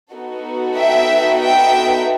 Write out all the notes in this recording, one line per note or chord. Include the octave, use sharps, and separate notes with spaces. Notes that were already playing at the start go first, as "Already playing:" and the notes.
B3 D#4 F#4 A4
E5 G5
E5 G5